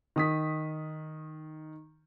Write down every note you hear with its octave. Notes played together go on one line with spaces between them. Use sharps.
D#3 D#6 B6